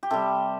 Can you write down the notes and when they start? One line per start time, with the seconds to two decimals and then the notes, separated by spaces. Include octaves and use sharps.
0.03 G4
0.10 C3 G3 A4